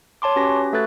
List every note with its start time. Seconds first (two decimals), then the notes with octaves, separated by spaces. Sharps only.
0.22 C#5 A5 C6 D6
0.36 C#4 F#4 G4 B4 A#6
0.73 A3 F#4 A4 B4 F#6 A6